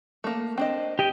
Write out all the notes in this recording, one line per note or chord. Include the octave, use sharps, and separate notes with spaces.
A3 A#3
C4 D4 D#5
G4 D#5 G5